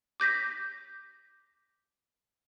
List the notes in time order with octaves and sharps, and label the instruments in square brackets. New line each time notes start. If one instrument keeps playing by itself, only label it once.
[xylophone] D6 G6 A#6 B6